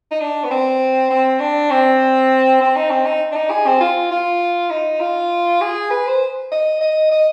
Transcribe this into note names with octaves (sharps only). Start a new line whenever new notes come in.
D#4
D4
B3
C4
C4
D4
C4
C4
D#4
C4
D#4
D4
D#4
G#4
C4
F4
F4
D#4
F4
G#4
B4
C5
D#5
D#5
D#5